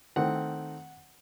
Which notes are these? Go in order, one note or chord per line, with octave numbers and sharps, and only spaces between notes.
D#3 A3 C4 F#5